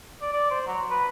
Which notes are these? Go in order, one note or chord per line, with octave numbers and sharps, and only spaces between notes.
D5
D5
C5
F#3
B4